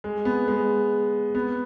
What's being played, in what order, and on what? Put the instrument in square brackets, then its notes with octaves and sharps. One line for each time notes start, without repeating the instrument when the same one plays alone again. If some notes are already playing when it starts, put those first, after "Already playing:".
[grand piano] G#3
B3
G#3
B3